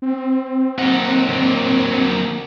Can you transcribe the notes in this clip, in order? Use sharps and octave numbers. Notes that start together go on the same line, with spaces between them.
C4
F#3 A#3 D#4 F#5
D3 A#3